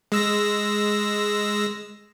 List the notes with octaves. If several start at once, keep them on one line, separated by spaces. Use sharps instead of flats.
G#3 E6 A#6